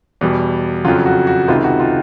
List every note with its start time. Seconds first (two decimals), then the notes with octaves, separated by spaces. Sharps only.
0.21 E2 B2 G3
0.85 F2 C#3 F#3 F4
1.06 F#4
1.27 F#4
1.48 C#2 C3 D#3 F4
1.64 F#4
1.80 F4